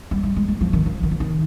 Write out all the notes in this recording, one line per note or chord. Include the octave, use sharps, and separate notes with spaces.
G3
G3
G#3
G#3
F3
D#3
F3
D#3
F3
D#3